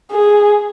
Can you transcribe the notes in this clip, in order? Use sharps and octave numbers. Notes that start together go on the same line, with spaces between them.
G#4